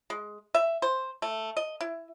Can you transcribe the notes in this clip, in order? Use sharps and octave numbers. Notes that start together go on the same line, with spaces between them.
G#3
E5
C5
A3
D#5
E4